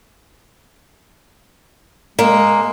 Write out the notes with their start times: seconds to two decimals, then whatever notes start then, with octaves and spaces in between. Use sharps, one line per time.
2.19 G#3 A#3